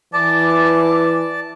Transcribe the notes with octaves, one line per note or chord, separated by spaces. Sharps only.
E3 D5 A5 D6